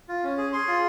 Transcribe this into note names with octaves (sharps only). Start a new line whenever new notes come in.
F4
C#4
G#4
G#4 C6
F4